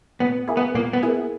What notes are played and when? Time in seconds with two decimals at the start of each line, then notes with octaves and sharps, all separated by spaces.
0.20 A#2 B3
0.48 A#3 E4 G#4
0.57 B3
0.75 A#2 A#3
0.93 B3
1.03 A#3 E4 G#4